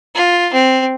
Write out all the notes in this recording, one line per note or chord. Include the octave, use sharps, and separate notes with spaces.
F4
C4